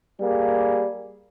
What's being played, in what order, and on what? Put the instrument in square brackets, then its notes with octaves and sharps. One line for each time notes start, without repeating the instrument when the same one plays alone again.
[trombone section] G3 A#3 G#4